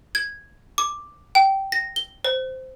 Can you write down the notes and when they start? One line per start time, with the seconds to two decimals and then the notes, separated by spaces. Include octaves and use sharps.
0.15 G#6
0.78 D6
1.35 G5
1.72 A#6
1.96 G7
2.25 C5